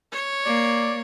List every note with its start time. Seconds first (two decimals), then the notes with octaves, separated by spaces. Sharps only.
0.12 C#5
0.45 A#3 D5